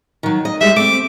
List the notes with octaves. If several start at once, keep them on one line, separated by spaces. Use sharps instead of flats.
D#3 F#3
D#5
G3 G#3 G4 E5
A3 C4 D6